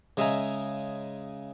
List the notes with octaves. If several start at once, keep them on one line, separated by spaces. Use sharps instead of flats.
C#3 G#3 D#5 E5 G#5 A#5